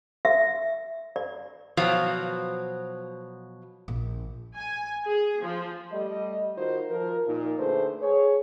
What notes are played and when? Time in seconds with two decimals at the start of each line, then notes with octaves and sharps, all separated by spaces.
0.25 E5
1.16 D5
1.77 B2 F3 F#3 C5 F5
3.88 A#1
4.56 G#5
5.06 G#4
5.42 F3
5.92 G3 A3 D#5
6.57 D#3 D#4 F4 F#4 A#4 C5
6.90 F3 A#4
7.27 A#2 D#4 F4
7.58 D3 A3 G#4 B4 C5
8.01 G#4 C#5